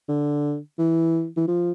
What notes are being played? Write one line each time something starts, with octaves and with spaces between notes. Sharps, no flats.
D3
E3
E3
F3